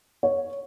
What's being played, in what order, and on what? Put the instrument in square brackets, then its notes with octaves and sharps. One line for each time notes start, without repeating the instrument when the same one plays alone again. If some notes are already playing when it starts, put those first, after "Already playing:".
[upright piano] C#5